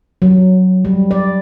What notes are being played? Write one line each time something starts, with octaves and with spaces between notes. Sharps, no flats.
F#3
G3
D5